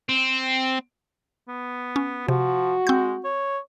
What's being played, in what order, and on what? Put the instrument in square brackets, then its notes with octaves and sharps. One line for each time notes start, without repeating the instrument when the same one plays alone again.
[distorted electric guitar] C4
[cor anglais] B3
[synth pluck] C#4
[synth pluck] C3 [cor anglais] F3 [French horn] F#4
[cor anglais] G#3 [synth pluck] C4 G6
[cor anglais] C#5